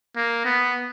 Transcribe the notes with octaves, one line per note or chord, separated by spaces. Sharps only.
A#3
B3